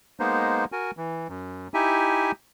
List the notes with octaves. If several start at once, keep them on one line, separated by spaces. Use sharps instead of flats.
G#3 A#3 B3 D#4 C5
F#4 A#4 G#5
E3
F#2
D#4 E4 G4 E5 G#5